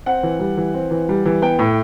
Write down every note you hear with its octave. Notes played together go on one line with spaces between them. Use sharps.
C4 F#5
E3
G3
E3
C4
E3
G3
E3
B3 G5
A2